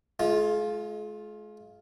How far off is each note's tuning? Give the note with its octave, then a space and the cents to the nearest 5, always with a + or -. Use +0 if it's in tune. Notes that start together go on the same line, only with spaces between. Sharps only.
G#3 +40 F4 +0